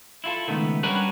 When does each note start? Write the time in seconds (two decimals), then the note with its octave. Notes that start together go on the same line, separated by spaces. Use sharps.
0.24 E4 F4 A4
0.48 C#2 D#3 A3 B3
0.83 G3 C#4 D4 F#4 A#4 B4